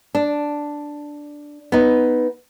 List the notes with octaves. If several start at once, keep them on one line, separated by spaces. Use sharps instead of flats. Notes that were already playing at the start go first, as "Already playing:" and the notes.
D4
B3 D#4